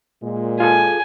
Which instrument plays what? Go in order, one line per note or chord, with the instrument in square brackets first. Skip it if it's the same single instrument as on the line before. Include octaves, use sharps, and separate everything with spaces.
[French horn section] A#2 G#3
[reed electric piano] F4 G#4 A4 [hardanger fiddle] G#5